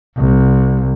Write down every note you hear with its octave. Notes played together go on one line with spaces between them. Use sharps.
C2